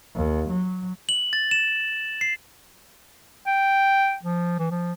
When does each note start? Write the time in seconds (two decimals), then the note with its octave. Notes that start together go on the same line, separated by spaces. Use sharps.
0.15 D#2
0.51 F#3
1.09 F#7
1.33 A6
1.51 E7
2.21 C7
3.47 G5
4.23 F3
4.59 E3
4.71 F3